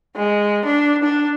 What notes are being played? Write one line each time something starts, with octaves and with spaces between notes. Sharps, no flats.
G#3
D4
D4